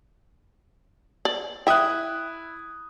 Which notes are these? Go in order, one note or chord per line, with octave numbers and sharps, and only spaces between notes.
D5
E4 E5 G5 D#6 F#6